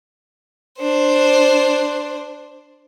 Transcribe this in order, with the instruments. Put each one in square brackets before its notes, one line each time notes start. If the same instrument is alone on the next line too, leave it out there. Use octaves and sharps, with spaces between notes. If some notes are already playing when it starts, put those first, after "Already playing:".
[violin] D4 C5